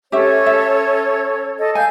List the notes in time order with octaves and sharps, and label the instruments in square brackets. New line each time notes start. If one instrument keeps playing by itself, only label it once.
[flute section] C#4 A4 C#5 [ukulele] G4 E5
[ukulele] E5
[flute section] A4 D#5
[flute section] F5 G6 [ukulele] G#5